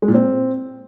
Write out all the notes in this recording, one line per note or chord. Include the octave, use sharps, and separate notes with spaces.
G#3
A#2
C4